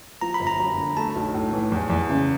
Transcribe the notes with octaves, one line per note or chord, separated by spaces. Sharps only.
F3 A#5
B5
G1
A#5
F#2
D3
A3 A5
B1
A2
E3
E2
E2
C#3